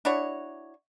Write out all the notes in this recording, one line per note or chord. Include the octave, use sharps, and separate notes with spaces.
D4 E4 F#4 C#5